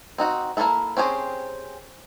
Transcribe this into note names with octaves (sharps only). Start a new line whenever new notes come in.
C4 D#4 F#4
A#3 C#4 E4 A4 E5
C4 C#4 G4 G#4 C5